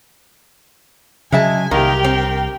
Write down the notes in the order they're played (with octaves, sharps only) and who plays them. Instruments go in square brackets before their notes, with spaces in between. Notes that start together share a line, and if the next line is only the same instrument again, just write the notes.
[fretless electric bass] C#3 F#3 [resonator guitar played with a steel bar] G#3 E5 A5 [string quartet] G#5
[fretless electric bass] C2 [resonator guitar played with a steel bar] D#3 A#3 [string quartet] G4 A#4 G5
[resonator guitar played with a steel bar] C4